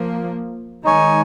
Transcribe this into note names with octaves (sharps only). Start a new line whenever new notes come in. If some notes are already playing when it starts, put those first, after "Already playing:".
Already playing: F3 A#3
D#3 G#3 D#4 C#5 G#5